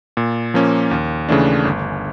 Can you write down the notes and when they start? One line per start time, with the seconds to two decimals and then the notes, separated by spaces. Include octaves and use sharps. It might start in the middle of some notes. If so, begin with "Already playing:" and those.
0.17 A#2
0.54 F3 A#3 C#4
0.91 D#2
1.29 C#3 E3 A3 D4
1.65 G1